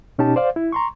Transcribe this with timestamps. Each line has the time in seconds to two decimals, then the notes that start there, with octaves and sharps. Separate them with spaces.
0.18 B2 C#4 D#4 G4 A5
0.36 C5 D5 F5
0.56 E4
0.72 A#5 C6 C#6